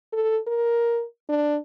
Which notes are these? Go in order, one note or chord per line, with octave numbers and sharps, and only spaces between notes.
A4
A#4
D4